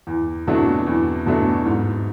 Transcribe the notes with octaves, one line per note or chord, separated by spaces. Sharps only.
E2
B2 F#3 A3 D4
E2
B2 F#3 A3 D4
G#2